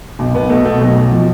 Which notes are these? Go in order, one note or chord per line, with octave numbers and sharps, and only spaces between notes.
B1
B1 B3
B2 A3
B2 A3
B1 F#3
B1
B2 F3